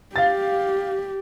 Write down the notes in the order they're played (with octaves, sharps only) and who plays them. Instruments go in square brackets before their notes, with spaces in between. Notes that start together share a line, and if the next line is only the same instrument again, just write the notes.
[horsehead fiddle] G4 [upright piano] F5 A6